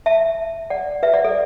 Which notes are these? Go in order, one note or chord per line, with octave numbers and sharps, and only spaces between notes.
E5 A5
D5 F#5
B4 E5
D5 F#5
A4 D5